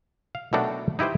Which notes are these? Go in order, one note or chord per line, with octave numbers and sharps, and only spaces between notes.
F5
B2 D#3 F#3 A3 D4 F#4
D#4 E4 G4 B4 C5